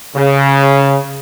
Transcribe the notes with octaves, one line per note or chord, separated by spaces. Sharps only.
C#3